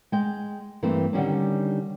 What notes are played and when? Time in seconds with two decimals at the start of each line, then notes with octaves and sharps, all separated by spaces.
0.12 G#3 G5
0.83 G2 E3 A3 A#3 C4
1.13 D3 D#3 G3 C#4 D4